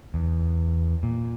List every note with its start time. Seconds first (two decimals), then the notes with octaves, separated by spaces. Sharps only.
0.14 E2
1.03 A#2